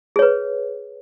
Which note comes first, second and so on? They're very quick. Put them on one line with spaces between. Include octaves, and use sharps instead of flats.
G#4 C#5 B4